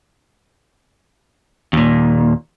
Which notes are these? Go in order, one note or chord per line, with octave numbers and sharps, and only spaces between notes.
D#2 A#2